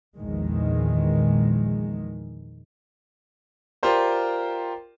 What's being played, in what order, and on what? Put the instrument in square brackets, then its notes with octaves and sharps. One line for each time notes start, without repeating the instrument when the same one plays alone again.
[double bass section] A#1 E2 D#3 G#3
[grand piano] F4 G4 A#4 C5 D5